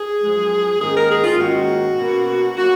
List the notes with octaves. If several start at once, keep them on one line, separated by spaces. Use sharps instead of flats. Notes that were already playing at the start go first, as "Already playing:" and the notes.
Already playing: G#4
F#2 F3 G#3
G#2 D#3 A#3 C#4 G#4
A#4
G#4
F4
G#2 D#3 A#3 C#4 F#4
B2 A#3 C#4
B2 A#3 C#4 F#4